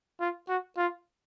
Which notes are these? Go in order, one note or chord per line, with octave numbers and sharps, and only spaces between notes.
F4
F#4
F4